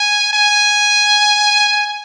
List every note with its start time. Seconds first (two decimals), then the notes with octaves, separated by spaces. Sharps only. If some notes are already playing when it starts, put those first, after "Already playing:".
Already playing: G#5
0.33 G#5